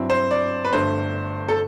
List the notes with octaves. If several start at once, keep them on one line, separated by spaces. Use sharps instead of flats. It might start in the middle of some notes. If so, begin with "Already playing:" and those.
Already playing: G2 F#3 C4 E4
C5
D5
B4
G1 G2 D3 A3 C5
A4